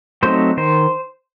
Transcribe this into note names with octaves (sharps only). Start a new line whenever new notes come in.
F#3 A3 C4 D#4 C5
D#3 C5